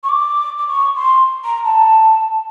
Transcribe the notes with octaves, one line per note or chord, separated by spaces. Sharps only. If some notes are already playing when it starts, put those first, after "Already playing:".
C#6
D6
D6
C#6
C6
A#5
A5